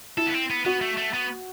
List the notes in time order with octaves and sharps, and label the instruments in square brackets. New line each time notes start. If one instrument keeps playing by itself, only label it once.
[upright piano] E4 [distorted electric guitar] A4
[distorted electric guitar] B3
C4
B3
[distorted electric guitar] B3 [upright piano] F#4
[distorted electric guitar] A3
A3
B3